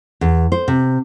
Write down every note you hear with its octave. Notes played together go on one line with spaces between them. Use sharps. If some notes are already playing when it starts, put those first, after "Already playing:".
E2
C5
C3